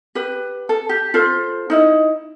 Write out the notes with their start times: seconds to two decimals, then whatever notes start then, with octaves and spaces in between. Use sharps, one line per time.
0.15 G4 B4 G5
0.69 A4
0.89 G4
1.14 F4 A4 C5
1.70 D#4 E4 D#5